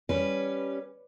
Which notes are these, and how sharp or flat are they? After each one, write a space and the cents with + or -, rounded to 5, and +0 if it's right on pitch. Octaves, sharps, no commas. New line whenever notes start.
G3 +0 C#4 +0 B4 +0